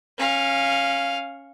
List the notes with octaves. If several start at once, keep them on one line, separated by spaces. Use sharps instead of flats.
C#4 F5